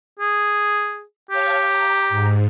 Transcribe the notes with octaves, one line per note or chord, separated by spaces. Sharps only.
G#4
G4 C#5 F5 A5
A#5
G#2